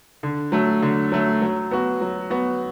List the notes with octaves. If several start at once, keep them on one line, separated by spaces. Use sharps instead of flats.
D3
F#3 A3
D3
F#3 A3
F#3
B3 F#4
F#3
B3 F#4